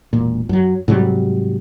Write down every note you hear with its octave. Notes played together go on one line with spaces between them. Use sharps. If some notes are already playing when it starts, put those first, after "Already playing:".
E1 A#2
F#2 F#3
G#2 C3 F#3 G3